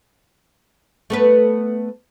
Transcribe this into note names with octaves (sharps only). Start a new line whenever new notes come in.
A3 B3 B4